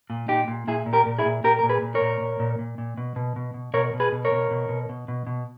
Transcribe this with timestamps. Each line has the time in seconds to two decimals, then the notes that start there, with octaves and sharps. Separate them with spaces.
0.10 A#2
0.28 A#2 D#4 G4
0.48 A#2
0.67 A#2 E4 G#4
0.86 A#2
0.93 G4 A#4
1.06 A#2
1.19 E4 G#4
1.25 A#2
1.44 A#2 G4 A#4
1.59 A#2 A#4
1.69 G#4 B4
1.82 A#2
1.95 A#4 C#5
2.01 A#2
2.20 A#2
2.40 A#2
2.59 A#2
2.78 A#2
2.97 B2
3.16 B2
3.36 B2
3.54 B2
3.74 B2 A#4 C#5
3.94 B2
4.00 G#4 B4
4.12 B2
4.25 A#4 C#5
4.32 B2
4.51 B2
4.69 B2
4.89 B2
5.08 B2
5.27 B2